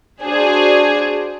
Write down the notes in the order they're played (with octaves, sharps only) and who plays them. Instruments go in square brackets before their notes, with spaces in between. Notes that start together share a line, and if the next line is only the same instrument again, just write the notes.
[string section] D4 F#4 G#4 C5